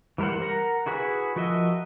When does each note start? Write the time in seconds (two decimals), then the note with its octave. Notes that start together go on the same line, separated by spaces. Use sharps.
0.18 E3 G3 A#4 C5 F#5
0.42 A#4 F#5 A#5
0.86 E4 F#4 G#4 B4 B5
1.36 F3 F#4 A#4 D#5 E5